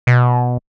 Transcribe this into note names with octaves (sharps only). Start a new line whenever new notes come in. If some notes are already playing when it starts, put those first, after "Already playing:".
B2